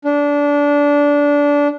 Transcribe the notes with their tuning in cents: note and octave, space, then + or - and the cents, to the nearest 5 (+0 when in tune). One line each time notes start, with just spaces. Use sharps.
D4 -20